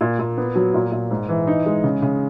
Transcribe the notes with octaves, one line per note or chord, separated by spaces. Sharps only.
A#2
A#2
B3
F#3
A#2
A#2
G#2
E3
D#4
G#3
C#3
C#3